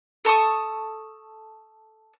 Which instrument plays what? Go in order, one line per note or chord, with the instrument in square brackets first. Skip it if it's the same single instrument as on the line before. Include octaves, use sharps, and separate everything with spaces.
[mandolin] A4 A5 C#6 D#6